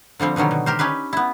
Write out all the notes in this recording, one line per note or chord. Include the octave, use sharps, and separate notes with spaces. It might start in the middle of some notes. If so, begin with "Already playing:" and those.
D3 F3 G3 C4
B2 D3 D#3 F#3 G3
B2
G4 A#4 C5
C#4 D#4 G4 B4
B3 E4